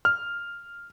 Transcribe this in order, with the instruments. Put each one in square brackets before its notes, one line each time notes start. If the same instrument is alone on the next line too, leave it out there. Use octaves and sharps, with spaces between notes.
[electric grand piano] F6